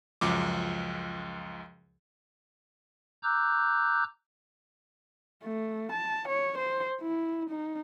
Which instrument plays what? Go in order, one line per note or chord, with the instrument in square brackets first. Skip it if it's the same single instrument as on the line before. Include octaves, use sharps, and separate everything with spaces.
[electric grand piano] C#2 F#2 F3 D6
[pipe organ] A#5 D6 E6 F#6 G6
[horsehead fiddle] A3
A5
C#5
C5
E4
D#4